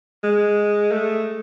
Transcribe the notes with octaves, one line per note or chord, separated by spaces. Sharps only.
G#3
A3